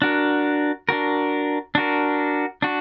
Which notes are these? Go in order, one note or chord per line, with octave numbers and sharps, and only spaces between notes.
D4 F#4 A#4
D4 F#4 A#4
D4 F#4 A#4
D4 F#4